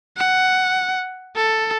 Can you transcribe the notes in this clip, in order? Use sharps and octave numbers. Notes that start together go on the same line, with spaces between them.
F#5
A4